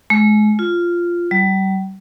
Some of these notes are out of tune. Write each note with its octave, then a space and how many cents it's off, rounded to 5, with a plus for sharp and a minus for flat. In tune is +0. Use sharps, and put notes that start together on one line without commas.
G#3 +35
F4 -5
G3 -35